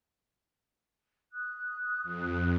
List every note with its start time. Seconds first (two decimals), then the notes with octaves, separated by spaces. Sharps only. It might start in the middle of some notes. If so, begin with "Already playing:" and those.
1.33 D#6 F#6
2.03 F2